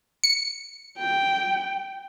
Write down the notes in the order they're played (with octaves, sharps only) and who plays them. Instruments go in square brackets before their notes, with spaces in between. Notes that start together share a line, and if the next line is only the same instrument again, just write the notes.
[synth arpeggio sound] C#7
[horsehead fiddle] G5